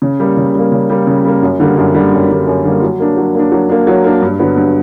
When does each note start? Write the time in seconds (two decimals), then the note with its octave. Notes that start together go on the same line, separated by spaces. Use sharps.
0.02 C#3
0.20 G3 A#3
0.37 C#3
0.55 G3 A#3
0.72 C#3
0.90 G3 A#3
1.07 C#3
1.24 G3 A#3
1.42 F#2
1.60 D3 G3 A#3
1.77 F#2
1.94 D3 G3 A#3
2.12 F#2
2.29 D3 G3 A#3
2.47 F#2
2.64 D3 G3 A#3
2.82 F#3
3.00 A#3 D4
3.17 F#3
3.35 A#3 D4
3.52 F#3
3.69 A#3 D4
3.87 F#3
4.04 A#3 D4
4.22 G2
4.39 D3 F#3 B3
4.57 G2